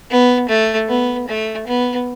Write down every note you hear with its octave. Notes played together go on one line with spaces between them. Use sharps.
B3
A3
B3
A3
B3